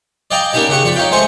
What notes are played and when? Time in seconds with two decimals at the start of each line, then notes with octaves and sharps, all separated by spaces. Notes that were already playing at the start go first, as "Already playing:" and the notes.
0.31 D5 D#5 F5 G5 G#5 A#5
0.53 A#3 B3 C#4 D#4 G4 D5
0.69 C#3 G4 F#5 C#6
0.83 F2 D5 B5
0.96 D#4 C#5 F5 G5
1.11 G#3 A3 C5 C#5 G#5 C#6